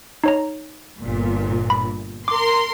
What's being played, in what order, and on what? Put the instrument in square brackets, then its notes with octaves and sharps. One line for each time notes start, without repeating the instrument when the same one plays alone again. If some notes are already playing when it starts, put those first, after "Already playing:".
[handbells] D#4 C#5 A#5
[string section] G1 A#2
[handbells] B5
[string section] A#4 C6 [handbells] D6